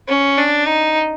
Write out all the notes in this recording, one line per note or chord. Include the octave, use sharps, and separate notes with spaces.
C#4
D4
D#4